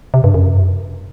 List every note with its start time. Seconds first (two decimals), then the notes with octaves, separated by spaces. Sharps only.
0.14 C3
0.24 G2
0.34 F#2